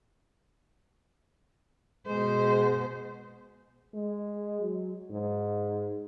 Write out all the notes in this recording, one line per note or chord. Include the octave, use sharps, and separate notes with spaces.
B2 G#3 C5
G#3
F#3
G#2